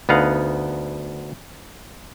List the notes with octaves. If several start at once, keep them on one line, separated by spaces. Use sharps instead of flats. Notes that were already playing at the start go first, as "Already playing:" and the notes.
D2 B3 D#4 F5 F#5